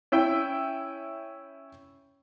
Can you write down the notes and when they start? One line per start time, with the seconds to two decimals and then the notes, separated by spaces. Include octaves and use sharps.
0.12 C#4 E4 E5 G5